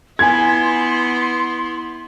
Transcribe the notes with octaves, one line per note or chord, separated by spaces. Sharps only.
B3 E4 F4 G#5 C6 G#6